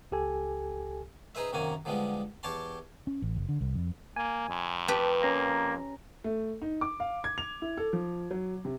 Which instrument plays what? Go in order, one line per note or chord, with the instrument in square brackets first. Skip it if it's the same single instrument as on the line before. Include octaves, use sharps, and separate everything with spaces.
[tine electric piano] C#2 G4 A4 G#5
[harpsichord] D#4 G#4 B4 C5 E5
F#2 C3 D#3 A#3 F#4 G#5
D3 F3 G3 G#3 B3
E2 G4 C#5 G5 A5 C6
[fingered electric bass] C#4
A1
F#1
D3
C2
F2
[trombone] A#3 [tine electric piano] G#5
[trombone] F2
[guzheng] G4 B4 [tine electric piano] A5
[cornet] A#3 [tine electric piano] C#4 A#5
[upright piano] A3
D#4
D6
F5
G#6
F7
E4
A4
F3
F#3
C3